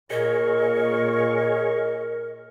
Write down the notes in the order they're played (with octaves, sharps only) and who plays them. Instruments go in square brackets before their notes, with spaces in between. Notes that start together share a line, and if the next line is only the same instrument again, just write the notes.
[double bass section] A#2 [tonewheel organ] G#4 C#5 C#6 [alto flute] A#4 [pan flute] D#5